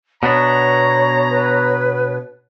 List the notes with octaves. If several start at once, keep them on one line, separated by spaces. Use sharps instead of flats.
B2 B3 D4 C#5 A#5
B4